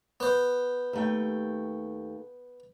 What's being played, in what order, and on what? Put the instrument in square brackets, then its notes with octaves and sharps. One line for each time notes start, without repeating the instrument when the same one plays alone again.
[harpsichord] B3 C5
[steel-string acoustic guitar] D#2 A3 G5